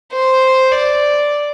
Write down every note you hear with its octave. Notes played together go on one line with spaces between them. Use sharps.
C5
D5